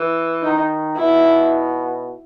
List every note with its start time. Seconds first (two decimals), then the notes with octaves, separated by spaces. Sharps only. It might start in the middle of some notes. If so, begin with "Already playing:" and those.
Already playing: E3
0.42 D#3 D#4
0.96 B2 E4